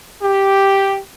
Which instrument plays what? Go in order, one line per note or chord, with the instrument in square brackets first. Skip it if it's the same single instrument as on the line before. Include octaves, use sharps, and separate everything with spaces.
[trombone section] G4